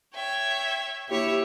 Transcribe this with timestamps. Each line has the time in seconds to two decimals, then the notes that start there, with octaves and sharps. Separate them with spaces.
0.14 C#5 E5 G5
1.09 A#3 E4 G4 C#5 E5